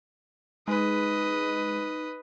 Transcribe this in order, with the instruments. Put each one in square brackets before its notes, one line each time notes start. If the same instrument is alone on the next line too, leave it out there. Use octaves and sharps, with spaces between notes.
[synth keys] G#3 [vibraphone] D#4 [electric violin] B4 D#5